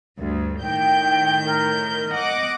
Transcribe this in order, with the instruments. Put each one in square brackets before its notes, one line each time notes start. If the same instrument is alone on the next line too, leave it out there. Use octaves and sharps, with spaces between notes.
[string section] D2 G2
[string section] A2 D#3 G6 [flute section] G5
[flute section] A#4
[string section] D#5 F#5 D6